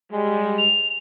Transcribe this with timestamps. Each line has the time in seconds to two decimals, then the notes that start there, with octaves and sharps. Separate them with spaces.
0.12 G3 G#3
0.58 F7